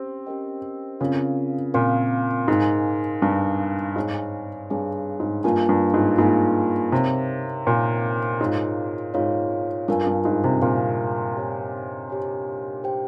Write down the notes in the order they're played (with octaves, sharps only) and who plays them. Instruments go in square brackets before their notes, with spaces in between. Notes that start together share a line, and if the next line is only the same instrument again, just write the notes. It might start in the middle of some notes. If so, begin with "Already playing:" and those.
Already playing: [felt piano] C4 [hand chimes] C#4 G4
[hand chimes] C#4 G4 A#4 D#5 G5
[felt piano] C#3 [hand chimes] C4 F4 A#4 F5
[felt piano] A#2 [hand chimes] C4 F4 A#4 F5
[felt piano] G#2 [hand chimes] D#4 A#4 F5 G#5
[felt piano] G2 [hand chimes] D#4 A#4 F5 G#5
[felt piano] G#2 [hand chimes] G#4 C#5 F5 G#5
[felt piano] G2 [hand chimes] G#4 C#5 F5 G#5
[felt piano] G#2
[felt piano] G2 [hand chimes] A#3 F4 A#4 F5 G#5
[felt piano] G2
G#2
[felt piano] G#2 [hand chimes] A#3 F4 A#4 F5 G#5
[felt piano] C3 [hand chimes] D#4 A#4 C#5 F5
[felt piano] A#2 [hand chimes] D#4 A#4 C#5 F5
[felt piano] G#2 [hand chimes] F4 A#4 C#5 F5
[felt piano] G#2 [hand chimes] F4 A#4 C#5 F5
[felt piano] G2 [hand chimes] F4 A#4 F5 G#5
[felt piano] G2
G#2
C3
[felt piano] A#2 [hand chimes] F4 A#4 F5 G#5
[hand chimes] G4 C#5 G#5
G4 C#5 G#5
G4 C5 G5